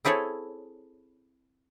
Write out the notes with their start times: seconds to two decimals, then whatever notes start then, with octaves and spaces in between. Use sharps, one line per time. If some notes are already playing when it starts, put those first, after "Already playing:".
0.05 C4 E4 G#4 A4 C#5